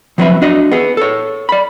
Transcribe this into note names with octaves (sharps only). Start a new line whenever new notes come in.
F3 F#3 B3 C4 B4 E5
D4 F#4 D#5
B3 G#4
A4 C#5
D5 B5